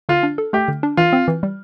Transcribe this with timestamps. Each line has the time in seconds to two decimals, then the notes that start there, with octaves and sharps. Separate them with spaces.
0.09 D3 F4
0.23 D4
0.38 A4
0.53 A3 G4
0.68 D3
0.83 D4
0.97 E3 F4
1.13 C4
1.28 E3
1.43 G3